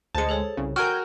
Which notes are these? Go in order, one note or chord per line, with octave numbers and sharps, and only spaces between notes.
D2 G#3 C5 A5 C#7
G#4 A4 C#5
C2 C#3
F#4 A#4 G5 G#5 F6 G6 D7